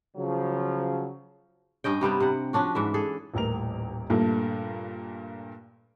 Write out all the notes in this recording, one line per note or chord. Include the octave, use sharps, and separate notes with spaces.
C#3 F3 F#3
G2 C#4 D#5 G5
C3 G3 B3 C4
C3 F#5
F3 C#4 D4 F#4
G#2 E3 E5
G#4 A4
D#1 A1 A#4 F7
G2 A#2 A3 A#3